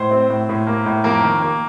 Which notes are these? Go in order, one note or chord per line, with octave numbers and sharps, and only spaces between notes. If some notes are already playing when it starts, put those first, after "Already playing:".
Already playing: A2 C5
C4
A2
A2
A#3
A2
F2 A#3 A#4
D#3
A#3